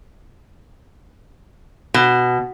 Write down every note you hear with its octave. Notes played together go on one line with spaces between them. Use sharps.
B2